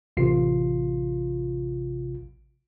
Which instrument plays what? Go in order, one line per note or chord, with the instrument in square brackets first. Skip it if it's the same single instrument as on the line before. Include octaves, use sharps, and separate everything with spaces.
[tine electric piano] A1 C3 F4 C7